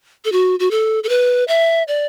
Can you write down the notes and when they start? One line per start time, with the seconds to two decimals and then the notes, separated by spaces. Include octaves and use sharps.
0.25 A4
0.32 F#4
0.60 F#4
0.71 A4
1.04 A4
1.09 B4
1.48 E5
1.88 D5